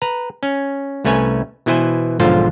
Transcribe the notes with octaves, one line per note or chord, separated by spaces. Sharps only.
B4 A#5
C#4
C2 A3 C#4 B4 C#5 G#5
B2 E3 E4 B4 C5 G#5
B1 G#2 D3 F3 F4 C5